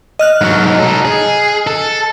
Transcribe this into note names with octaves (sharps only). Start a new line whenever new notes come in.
D#5 F6 F#6
G#2 F#3
D#4 A4
G#4
A4